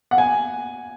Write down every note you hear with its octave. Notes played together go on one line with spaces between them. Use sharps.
F#5
G#5